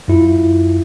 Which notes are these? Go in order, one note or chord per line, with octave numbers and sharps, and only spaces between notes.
F#2 E4 F4